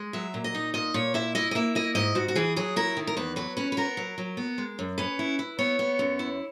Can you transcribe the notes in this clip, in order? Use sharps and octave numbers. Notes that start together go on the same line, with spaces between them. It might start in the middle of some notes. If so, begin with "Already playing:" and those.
Already playing: G#3
F#3 E5
A#2
D#5
D#4
A#2 D#5
A#2 C#5
E4 E5
E4 D#5
D#5
A#3 E5
E4 D#5
G#2 D#5
G#2 F#4
F#4
E3 G#4
F#3 G#4
E4 A#4
D#3
A#4
E2 B4
F#3 B4
C#4 B4
B4
B3 A#4
F#3
F#3
B3
G#3
F#2
C#4 B4
E4
E4
B3 C#5
B3
F#2
E4